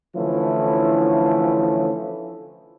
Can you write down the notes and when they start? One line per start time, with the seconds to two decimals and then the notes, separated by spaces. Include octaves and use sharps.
0.16 D3 E3 F3 A3 C#4 E4